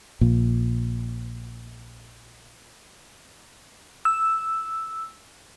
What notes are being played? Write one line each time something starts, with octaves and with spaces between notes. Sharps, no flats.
A#1 A#2
E6